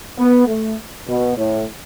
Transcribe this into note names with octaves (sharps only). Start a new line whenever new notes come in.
B3
A3
B2
A2